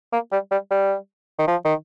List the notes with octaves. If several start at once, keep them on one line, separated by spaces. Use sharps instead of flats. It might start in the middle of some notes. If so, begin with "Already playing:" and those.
A#3
G3
G3
G3
D#3
F3
D#3